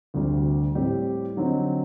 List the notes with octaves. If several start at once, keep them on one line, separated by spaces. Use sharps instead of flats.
D2 C3 G3 D4 F#4
A2 G3 C4 G4 D5
D3 F#3 C4 D#4 F#4